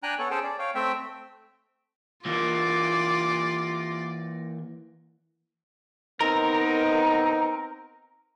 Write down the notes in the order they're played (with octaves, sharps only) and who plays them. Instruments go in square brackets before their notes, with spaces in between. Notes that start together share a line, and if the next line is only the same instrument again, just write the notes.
[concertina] D4 G5 G#5 A#5 F#6
B3 A4 C#5
C#4 G#4 A4 C5 G5 A5
D5
C#5 F5 G5
A3 C4 E5 G5
[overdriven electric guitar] E3 A#3 [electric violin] F4 D5
[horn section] B3 C4 D#4 [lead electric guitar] A#4